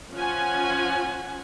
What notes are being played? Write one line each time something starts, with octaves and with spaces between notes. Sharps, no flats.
F3 C#4 F4 F#5 G#5